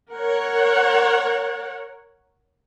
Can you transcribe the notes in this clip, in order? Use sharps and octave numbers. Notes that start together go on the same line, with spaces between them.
A#4 C#5 F#5